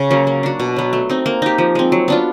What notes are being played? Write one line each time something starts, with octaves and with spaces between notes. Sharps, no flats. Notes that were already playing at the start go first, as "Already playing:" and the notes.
Already playing: C#3
F#3 A#3 C#4
A#3
D4 F#4
B2
F#3 B3
A3
C4 D#4
A#3
D#4 G4
F3
G#3 C4
F#3
B3 D4 F4